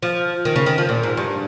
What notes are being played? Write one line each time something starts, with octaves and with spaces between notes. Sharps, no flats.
F3
D#3
C#3
D#3
F3
A#2
G#2
G2